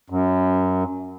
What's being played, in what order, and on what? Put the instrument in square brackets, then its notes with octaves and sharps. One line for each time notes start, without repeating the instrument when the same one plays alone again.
[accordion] F#2